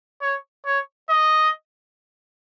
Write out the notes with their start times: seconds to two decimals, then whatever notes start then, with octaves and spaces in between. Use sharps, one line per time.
0.21 C#5
0.65 C#5
1.09 D#5